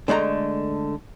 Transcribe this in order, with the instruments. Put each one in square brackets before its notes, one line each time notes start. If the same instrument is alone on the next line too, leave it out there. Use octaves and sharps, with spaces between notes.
[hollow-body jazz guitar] D3 G#3 A3 F#5 A#5